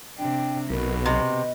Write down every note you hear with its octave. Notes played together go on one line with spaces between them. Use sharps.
C3 D4 G5
B1 B2 B3 A#4
C3 D#5